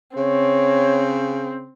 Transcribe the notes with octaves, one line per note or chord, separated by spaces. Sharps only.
C#3 C4 C#5